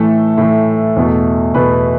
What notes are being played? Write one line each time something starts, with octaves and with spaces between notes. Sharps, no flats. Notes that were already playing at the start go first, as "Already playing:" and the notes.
Already playing: A2 E3 A3 A4
A2 E3 A3
E2 B2 A3
E2 B2 A3 B4